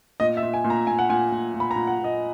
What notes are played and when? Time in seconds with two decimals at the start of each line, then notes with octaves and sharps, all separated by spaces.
0.20 A#2 D#5
0.37 E5
0.43 A#2
0.53 G#5
0.64 A#2
0.70 A#5
0.87 A#2 G#5
0.99 F#5
1.09 A#2 G#5
1.32 A#2
1.54 A#2
1.60 B5
1.71 A#5
1.76 A#2
1.87 F#5
1.99 A#2
2.04 D#5